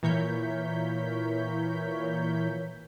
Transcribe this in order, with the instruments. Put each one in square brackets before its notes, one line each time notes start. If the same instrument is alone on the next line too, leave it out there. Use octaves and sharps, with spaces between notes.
[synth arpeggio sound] A#2 E3 A#4 C#5 G6 B6